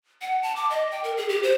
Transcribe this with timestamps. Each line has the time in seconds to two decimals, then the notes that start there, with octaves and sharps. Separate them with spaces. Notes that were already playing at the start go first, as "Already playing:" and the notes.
0.21 F#5
0.42 A5
0.56 D6
0.70 D#5
0.91 G5
1.04 A#4
1.17 G#4
1.29 G4
1.43 C5